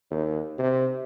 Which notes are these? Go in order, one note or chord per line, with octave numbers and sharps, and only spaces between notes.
D#2
C3